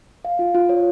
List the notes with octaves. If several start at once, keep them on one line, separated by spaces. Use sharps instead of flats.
F5
F4
F4
C#5